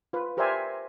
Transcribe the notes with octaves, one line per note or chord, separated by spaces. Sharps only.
F4 B4
G4 A#4 C5 D5 E5 G#5